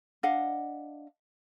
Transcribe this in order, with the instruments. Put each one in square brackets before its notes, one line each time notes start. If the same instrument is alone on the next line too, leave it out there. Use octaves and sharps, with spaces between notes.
[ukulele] D4 D#5 F5 F#5